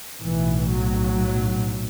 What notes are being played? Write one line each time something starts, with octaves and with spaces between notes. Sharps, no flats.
B1 A2 E3
F#3